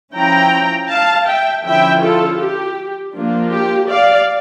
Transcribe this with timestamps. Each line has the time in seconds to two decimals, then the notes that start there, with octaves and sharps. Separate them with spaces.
0.15 F3 C#4 E4 G5 A#5
0.90 F5 A5
1.27 E5 G5
1.65 D3 F3 C#4 E4 E5 G5
2.02 F4 A4
2.40 G4
3.15 F3 A#3 D4 F4
3.52 G4
3.90 D5 F5